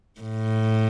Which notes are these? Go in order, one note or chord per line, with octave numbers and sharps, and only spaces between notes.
A2